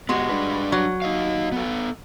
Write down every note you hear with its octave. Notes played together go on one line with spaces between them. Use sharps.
G#3 B3 F#4 G4
G3 D4 B4
F#3
D#4 D#5 F5
B3 A4